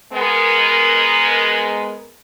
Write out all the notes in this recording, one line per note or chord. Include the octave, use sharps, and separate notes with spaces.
G#3 B3 A#4